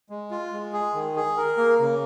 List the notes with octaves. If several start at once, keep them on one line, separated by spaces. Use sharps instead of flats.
G#3
F4
G#3
G#4
D#3
G#4
A#4
A#3
C#3